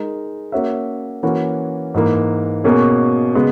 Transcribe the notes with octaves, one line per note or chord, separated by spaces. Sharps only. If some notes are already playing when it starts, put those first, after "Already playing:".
Already playing: G#3 D#4 A#4
A#3 C#4 F#4 C#5 E5
E3 A#3 C#4 F#4
G#2 E3 A#3
B2 A#3 C#4 G#4
C#3 G#3 B3